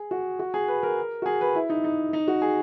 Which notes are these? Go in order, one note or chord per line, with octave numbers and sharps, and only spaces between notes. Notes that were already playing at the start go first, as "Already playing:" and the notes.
Already playing: G#4
F#4
F#4
G#4
B4
A#4
F#4
G#4
B4
E4
D#4
D#4
D#4
F#4
G#4